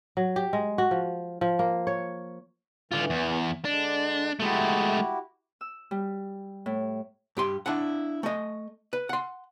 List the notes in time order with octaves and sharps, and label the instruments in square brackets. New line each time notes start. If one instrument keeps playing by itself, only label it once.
[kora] F#3
G4
G#3
F#4
F3
F3
A#3
C#5
[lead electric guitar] D3 F4 [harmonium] E3
[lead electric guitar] E2
[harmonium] D3 G#3 [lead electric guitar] D4
[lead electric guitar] G#3 A3 [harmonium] E4 F#4 G4
[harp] E6
G3
A2
[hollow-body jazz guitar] G2 G4 C6
D4 E4 F#5
A3 D#5
B4
F#5 C6